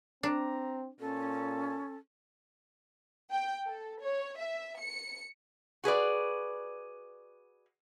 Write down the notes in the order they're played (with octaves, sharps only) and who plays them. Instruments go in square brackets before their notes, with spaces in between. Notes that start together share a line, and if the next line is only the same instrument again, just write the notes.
[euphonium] C4 [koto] D4 [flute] A#5
[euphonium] A#2 [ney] C#4 [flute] A4
[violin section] G5
A4
C#5
E5
C#7
[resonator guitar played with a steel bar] F#4 G#4 B4 D5